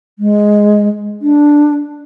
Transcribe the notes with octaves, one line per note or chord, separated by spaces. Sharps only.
G#3
D4